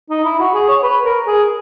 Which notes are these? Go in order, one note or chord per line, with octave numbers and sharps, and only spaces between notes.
D#4
E4
F#4
G#4
C#5
B4
A#4
G#4